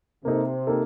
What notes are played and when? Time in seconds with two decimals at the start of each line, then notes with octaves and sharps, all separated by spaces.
0.25 C3 A#3 D#4 A4
0.67 A#3 D#4 A4